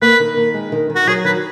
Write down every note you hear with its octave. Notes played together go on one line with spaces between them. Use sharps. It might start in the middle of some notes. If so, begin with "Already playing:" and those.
A#3 B4
D#3
D#3
G#3
D#3
D#3
F#4
F#3 G#4
D#3 B4